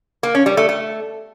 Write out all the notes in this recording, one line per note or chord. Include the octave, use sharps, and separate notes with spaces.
A#3
C#4
G3
A3
A3